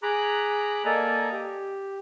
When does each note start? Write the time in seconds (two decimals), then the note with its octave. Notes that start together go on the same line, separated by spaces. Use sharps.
0.03 G#4 A#5 B5 D6 F#6
0.85 A#3 A4 D5 D#5 G#5 A#5
1.32 G4